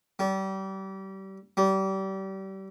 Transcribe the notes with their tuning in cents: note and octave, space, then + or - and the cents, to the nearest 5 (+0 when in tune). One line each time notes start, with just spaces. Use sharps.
G3 -30
G3 -30